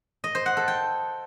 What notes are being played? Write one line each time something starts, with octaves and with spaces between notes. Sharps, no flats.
D#5
C5
F#5
A4
G5